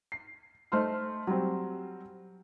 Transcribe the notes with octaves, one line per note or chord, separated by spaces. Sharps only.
C7
A3 D#4 C5 C6 F6
F#3 G3 C4